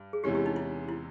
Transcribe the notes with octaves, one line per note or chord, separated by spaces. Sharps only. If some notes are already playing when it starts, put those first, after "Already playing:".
Already playing: G2
G#4
E2 C3 E3 G#3 C#4 G4
G4
D#4
E4
E4